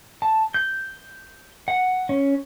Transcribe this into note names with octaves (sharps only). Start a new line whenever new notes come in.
A5
G6
F#5
C#4